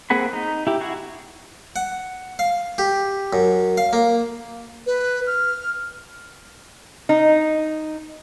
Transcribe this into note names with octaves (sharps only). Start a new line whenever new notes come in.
A#3 C4 G#4 F#5 B5
D#4
E4 G4
E4 F#4 G#4 F#5
F#5
F5
G4
F#2
F5
A#3
B4
F6
D#4